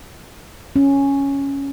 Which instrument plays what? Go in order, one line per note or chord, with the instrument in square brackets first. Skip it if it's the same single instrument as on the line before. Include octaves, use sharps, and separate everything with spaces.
[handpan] C#4